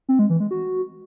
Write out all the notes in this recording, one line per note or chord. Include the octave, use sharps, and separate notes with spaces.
C4
G#3
E3
G#3
F#4